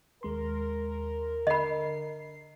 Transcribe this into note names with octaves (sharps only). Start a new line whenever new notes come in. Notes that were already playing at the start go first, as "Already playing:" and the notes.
D#2 G#3 A#4 C6
D3 D#5 B5 C7